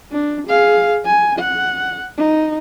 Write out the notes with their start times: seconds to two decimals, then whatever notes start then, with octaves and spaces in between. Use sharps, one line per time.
0.12 D4
0.48 G#4 F5
1.05 G#5
1.39 F#5
2.17 D#4